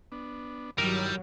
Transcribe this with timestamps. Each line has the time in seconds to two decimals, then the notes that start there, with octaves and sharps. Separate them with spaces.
0.12 B3 D4
0.78 G2 D#3 F#3 G3 E4 A#4